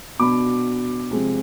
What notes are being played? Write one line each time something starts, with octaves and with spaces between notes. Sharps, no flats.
B2 B3 D4 B5 D6
C3 F3 G#3 C4